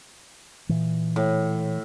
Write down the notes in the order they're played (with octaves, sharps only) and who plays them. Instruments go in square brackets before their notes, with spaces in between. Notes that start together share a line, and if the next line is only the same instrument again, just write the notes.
[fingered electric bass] A#2 E3
[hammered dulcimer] A2